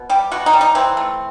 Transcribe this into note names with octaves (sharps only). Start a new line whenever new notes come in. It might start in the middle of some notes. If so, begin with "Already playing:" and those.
Already playing: B2
G3 G4
B2 F#4
D#4
G3
D#4
E3 C4
A3